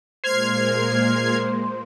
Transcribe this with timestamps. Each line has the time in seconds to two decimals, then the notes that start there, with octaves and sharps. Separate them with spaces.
0.24 A#2 G#3 A#3 C5 F6 G#6 C7